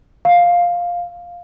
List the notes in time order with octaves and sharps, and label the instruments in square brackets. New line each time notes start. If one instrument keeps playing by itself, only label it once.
[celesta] F5